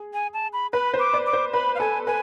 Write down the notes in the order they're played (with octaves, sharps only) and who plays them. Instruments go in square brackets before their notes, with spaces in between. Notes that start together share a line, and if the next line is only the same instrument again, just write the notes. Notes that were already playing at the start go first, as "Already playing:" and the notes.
Already playing: [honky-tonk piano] G#4
[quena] G#5
A5
B5
[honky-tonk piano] B4 [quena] B5
[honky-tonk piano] C5
[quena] D6
[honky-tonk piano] D5
[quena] D6
[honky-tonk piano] C5
[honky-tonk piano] B4 [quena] B5
[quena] F5
[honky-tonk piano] A4 [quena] G#5
[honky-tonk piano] B4 [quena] G#5